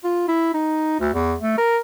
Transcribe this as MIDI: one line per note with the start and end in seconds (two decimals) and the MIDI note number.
0.04 0.26 65
0.28 0.54 64
0.54 0.98 63
1.00 1.09 38
1.14 1.36 40
1.41 1.57 57
1.58 1.79 70